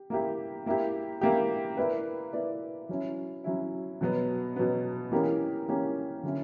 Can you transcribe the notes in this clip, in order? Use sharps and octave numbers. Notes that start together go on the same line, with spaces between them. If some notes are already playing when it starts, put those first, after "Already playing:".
Already playing: G4
A#3 E4 G4
A#3 E4 G4
A#3 E4 G4
A#3 E4 B4 D5
A#3 E4 B4 D5
F#3 C#4 E4
F#3 C#4 E4
B2 F#3 B3
B2 F#3 B3
E3 A#3 C#4 G4 A#4
E3 A#3 C#4 G4 A#4
D3 F#3 C#4 E4